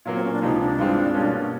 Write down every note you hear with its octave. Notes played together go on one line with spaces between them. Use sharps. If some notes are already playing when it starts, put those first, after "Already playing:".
A#2 F#3 A#3 B3
C4
C#4
D4
C#2 C3 F3 D#4
D4
G2 E3 G#3 C4 F4
B2 G3 A#3 C#4